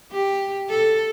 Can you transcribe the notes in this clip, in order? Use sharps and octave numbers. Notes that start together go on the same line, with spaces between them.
G4
A4